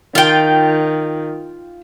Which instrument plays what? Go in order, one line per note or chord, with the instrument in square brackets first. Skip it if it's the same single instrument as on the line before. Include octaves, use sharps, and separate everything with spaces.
[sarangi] D#3 [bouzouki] F4 G5